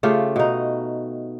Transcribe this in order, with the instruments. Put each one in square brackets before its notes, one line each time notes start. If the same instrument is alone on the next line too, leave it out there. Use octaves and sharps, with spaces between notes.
[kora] C#3 A3 F4 G4
B2 D#4